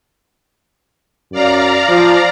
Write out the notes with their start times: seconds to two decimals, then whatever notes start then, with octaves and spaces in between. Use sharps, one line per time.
1.32 F#2 D5 F5 A#5
1.88 F3